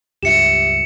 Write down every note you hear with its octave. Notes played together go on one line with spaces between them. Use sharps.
C#2 G2 F4 G4 E5 C#7 E7